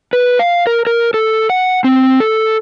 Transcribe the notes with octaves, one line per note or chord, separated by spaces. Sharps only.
B4
F5
A#4
A#4
A4
F#5
C4
A4